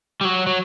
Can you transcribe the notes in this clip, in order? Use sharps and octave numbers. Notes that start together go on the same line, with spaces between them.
G3
F#3
F#3